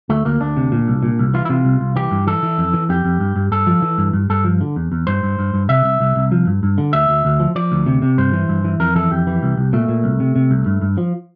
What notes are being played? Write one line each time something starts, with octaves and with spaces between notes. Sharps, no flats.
D2 A3
D2 A#3
D2 D4
C3
A#2
C2
A#2
C2
E3 F4
E4
C3 F4
C2
C2
E3 G4
G2
E3 A4
E3
F2
E3
F2 G4
F2
G2
G2
G2 A4
F3
E3
G2
G2
G2 A4
F3
D3
E2
E2
G2 C5
G2
G2
G2
C3 E5
C2
C2
C2
F3
G2
G2
D3
D2 E5
D2
D2
F3
F3 D5
D2
C3
C3
G2 C5
E3
G2
E3
F2 A#4
E3 A4
F2 G4
E3
C2
C2
A#2 A3
A#2
C2
C3
C3
C2
G2
G2
F3